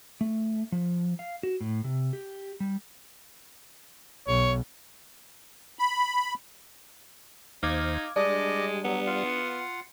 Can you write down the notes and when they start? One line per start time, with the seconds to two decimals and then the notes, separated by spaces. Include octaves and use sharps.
0.21 A3
0.72 F3
1.19 F5
1.43 F#4
1.61 A2
1.84 C3
2.13 G4
2.60 G3
4.27 B1 C#5
5.79 B5
7.63 D#2 D#4 C5 F5 D6 G#6
8.16 G3 G#3 D4 D5 D#5
8.84 F#3 B3
9.07 F4 F5 F#5